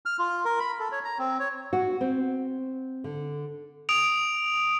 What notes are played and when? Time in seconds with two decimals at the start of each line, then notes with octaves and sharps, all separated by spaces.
0.06 F6
0.19 F4
0.45 A#4
0.60 B5
0.79 A4
0.92 C#5
1.04 A#5
1.19 C4
1.40 C#5
1.73 F#4
2.01 C4
3.04 D3
3.89 D#6 D7 F7